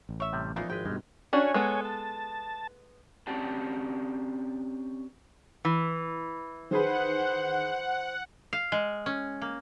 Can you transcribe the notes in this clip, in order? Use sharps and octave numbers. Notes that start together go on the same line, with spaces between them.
A1
C#5 E5
A2 C3 G3
A#2 F3 G#3 A#3 B3 D#4 E4
G#1 G#3 B4 G5
G2 B2 D#3 G3 G#3
C#4 D4 F#4 C#5 G#5
G#3 B3 A4
A5
C4 C#4 G4 D5 F#5 A5
E3
D#3 G#4 B4 C5 F#5
F5
G#3
C#4
A#3